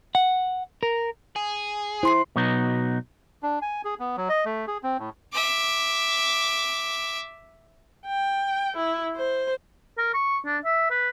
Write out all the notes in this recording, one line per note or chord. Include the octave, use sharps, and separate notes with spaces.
F#5
A#4
G#4
E4 C5 C6 C7
B2 F#3 B3 D#4
D4
G#5
G#4
B3
F#3
D#5
A3
G#4
C4
A2
E5 D6
G5
E4
C5
A#4
C#6
D4
E5
B4